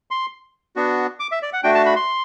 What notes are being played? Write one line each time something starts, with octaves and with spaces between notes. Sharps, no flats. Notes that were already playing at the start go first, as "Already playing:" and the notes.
C6
B3 D4 F#4
D6
E5
D5
F#5
A3 D4 F#4 G5
A5
B5
C6